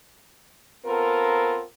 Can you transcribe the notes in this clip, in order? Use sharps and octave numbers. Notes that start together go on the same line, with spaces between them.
B3 C4 F4 A4 A#4